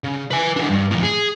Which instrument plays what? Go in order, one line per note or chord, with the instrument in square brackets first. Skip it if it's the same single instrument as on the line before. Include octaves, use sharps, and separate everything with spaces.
[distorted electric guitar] C#3
B4 G#5
E3 D4
G2
F2 A2
G#4